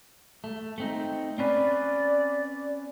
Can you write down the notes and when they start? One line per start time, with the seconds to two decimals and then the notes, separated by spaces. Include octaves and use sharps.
0.44 A3
0.78 A3 C4 D#4
1.38 C4 C#4 B4 D5